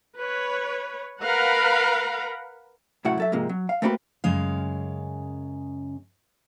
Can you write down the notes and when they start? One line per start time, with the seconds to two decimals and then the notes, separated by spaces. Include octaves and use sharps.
0.19 B4 C#5
1.23 A#4 B4 F5 F#5 A#5 B5
3.05 C2 F#2 A2 E4 F#4 F#5
3.18 F#3 A4 E5
3.32 G#2 C3 F3 G#3 A#3
3.49 F#3
3.69 F5
3.82 A3 A#3 C4 F#4 G4 B4
4.24 F#2 C#3 G#3 F5